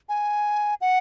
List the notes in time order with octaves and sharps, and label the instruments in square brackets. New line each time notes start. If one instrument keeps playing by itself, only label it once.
[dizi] G#5
F#5